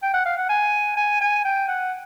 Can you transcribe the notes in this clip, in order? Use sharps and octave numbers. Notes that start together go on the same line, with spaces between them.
G5
F#5
F5
F#5
G#5
G#5
G#5
G5
F#5